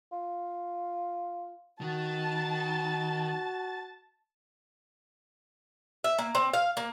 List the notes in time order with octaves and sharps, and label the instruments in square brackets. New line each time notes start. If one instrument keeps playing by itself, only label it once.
[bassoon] F4
[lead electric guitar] D#3 [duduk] F#4 [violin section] A5 A6
[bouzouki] E5
A#3
C4
F5
A#3